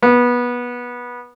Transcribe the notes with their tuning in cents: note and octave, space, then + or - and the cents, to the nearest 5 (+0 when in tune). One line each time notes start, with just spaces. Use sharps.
B3 -20